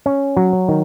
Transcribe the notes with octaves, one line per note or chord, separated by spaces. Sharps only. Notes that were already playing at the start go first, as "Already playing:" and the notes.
C#4
F#3
D#3